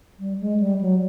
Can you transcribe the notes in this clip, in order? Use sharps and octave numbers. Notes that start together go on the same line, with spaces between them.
G3
G#3
G3
F#3